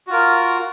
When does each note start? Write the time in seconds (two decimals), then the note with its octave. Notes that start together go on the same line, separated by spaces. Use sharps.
0.07 F#4
0.10 F4
0.13 A#4